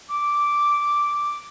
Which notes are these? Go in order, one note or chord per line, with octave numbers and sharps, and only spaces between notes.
D6